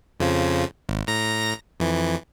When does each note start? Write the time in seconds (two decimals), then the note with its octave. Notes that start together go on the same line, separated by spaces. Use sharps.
0.20 F2 C#3 F3
0.89 G#1
1.07 A2 A#5 A#6
1.80 F2 E3